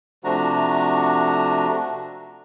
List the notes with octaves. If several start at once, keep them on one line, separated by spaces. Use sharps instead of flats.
C3 F3 A3 D4 F#4 A#5